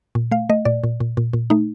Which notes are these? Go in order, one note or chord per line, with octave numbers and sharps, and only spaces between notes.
A#2
A3 F5
A3 D#5
A#2 D5
A#2
A#2
A#2
A#2
A3 D#4